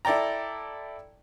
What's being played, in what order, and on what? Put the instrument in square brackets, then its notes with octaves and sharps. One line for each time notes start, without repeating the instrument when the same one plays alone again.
[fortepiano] E4 A4 D5 G5 A#5